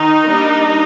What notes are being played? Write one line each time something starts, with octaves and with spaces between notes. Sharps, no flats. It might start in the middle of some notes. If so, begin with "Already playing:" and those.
Already playing: D#3 D#4
G3 A#3 D4